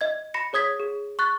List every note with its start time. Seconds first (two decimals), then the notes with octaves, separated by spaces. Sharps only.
0.01 D#5 G#6
0.34 B5 A#6 C#7
0.53 G#4 C#5 D#6 G#6 B6
0.80 G#4
1.19 C#6 F#6 A6